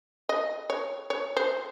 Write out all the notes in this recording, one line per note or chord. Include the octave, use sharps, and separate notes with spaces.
D#5
C#5
C#5
C5